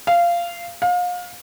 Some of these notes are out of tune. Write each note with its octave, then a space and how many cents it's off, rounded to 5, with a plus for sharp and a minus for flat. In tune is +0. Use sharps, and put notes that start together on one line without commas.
F5 -15
F5 +35